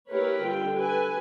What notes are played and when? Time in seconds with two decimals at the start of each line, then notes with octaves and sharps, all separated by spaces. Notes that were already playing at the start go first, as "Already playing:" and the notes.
0.11 A#3 E4 G4 A#4 B4 C#5
0.41 D3 G3 F4 G5
0.76 G4 A4 B4 G#5